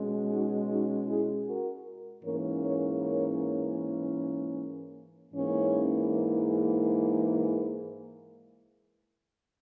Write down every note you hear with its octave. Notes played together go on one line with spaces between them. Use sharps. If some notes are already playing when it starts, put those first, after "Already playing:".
Already playing: B2 G#3 C#4
D#4 F#4
D#4 F#4
E4 G#4
F#4 A#4
G#2 E3 A#3 C#4 A#4 C#5
A#4 C#5
A#4 C#5
G#2 E3 A#3 C#4